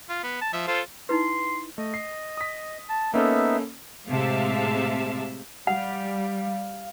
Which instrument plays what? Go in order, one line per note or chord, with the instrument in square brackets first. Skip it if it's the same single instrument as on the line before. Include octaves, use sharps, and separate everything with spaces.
[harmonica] F4
B3
A5
F3 E5
F4 A4 C5
[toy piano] D#4 E4 B4 [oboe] C6
[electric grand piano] A3 [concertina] D#5
[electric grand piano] C7
D#6 B6
[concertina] A5
[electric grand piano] A#3 C#4 A4 [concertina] B3 D#4 E5
[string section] A2 C3 G#3 E5 F5 A5
[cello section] G3 [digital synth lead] F5 [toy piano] F#5